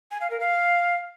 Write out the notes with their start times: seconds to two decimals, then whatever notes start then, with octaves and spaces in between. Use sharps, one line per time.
0.11 G#5
0.21 F5
0.30 A#4
0.40 F5